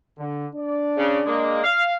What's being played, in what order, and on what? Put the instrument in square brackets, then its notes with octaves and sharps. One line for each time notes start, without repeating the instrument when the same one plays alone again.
[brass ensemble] D3
D4 D5
[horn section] C#3
G#3 A#3
F5